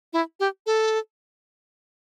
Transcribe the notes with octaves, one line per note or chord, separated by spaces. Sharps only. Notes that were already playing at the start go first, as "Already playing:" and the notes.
E4
G4
A4